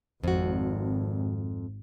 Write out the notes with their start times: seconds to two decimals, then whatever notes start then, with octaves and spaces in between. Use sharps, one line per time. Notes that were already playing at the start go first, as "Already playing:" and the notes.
0.24 G#1 F2 F#4